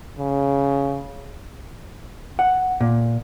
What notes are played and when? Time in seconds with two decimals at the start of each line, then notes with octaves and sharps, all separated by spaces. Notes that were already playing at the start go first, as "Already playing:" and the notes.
0.19 C#3
2.39 F#5
2.81 A#2